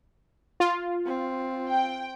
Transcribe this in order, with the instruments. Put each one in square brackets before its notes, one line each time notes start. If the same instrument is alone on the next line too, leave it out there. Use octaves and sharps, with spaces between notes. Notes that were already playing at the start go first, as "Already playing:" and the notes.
[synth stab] F4
[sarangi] C4
[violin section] G5